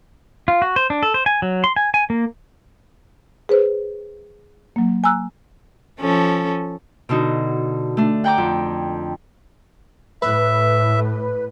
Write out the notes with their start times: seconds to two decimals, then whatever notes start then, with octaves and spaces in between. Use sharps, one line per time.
0.48 F4
0.62 F#4
0.76 C5
0.90 D4
1.03 A4
1.14 C5
1.26 G#5
1.42 F#3
1.64 C6
1.76 G#5
1.94 G#5
2.10 A#3
3.49 G#4 B4 C5
4.76 F#3 A#3
5.04 G#5 A#5 E6 F#6
6.01 F3 C#4 A4
7.09 B2 D3 D#4 F#4
7.97 A3 D4
8.24 F#5 G5 A#5 D6
8.38 F2
10.22 A2 B4 E5